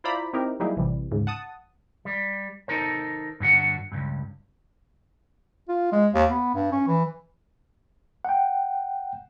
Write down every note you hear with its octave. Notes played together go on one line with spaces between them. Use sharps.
E4 F4 C5 D5 A#5 B5
C4 D#4 E4 G4 A#4
F#3 G3 A#3 D#4 E4 G#4
A1 C3 E3 G3
D2 G#2 C#3
F#5 A5 D#6
G3
D#4 A4 A#4 C5
G2 D3 F#4 F#5
C#2 G2
F4
G#3
D#2
B3
G2
C#4
E3
F#5 G5